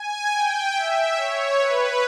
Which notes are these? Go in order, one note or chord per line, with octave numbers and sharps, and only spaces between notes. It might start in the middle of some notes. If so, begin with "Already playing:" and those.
Already playing: G#5
G5
E5
C#5
B4